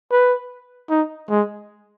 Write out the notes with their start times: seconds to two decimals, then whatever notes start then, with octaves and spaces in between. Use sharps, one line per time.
0.11 B4
0.90 D#4
1.30 G#3